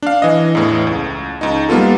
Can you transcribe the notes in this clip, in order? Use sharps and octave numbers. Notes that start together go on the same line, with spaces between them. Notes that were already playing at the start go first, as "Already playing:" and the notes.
D4 F5
E3 D#5
E2 A2
C#2
C#2 D#4
G3 A#3 B3 F4 A4